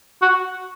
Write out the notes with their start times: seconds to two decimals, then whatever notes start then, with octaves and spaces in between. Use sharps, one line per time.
0.22 F#4